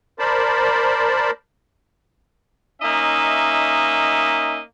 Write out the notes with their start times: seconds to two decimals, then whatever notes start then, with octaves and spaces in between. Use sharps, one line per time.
0.19 A#4 C5 D5 A5 B5
2.82 A#3 C#4 D#4 D#5 E5